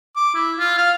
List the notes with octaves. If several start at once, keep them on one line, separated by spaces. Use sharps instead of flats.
D6
E4
F4
F5